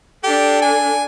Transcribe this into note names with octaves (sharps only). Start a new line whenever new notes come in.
D4 G4 A4
G#5